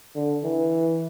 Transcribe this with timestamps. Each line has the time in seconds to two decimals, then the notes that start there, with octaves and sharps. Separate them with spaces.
0.15 D3
0.44 E3